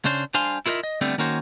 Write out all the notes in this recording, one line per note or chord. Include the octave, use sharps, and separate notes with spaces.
C#3 C#4 D4 C5
G3 D4 C5 F5 G#5 C6
E4 F4 A#4 B4 D#5 E5
D#5
D3 G3 A3 B3 C4 D4
D#3 A#3 C#4 F#4 C5